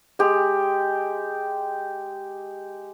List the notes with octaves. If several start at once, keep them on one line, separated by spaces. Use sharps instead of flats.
G#3 G4